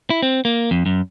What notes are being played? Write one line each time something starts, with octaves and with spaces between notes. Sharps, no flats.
E4
C4
A#3
F2
F#2